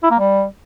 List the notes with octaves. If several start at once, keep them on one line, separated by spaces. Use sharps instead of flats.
E4
A#3
G3